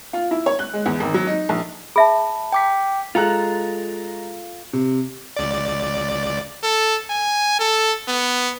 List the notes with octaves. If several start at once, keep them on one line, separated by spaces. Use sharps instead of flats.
F4
E4
C#5
F#6
G#3
E2
G#1
F#3
D#4
A#1
G#4 E5 A5 B5
G5 D6 B6
G#3 F4 A4 A#5 F#6
C3
C#2 D5
A4
G#5
A4
B3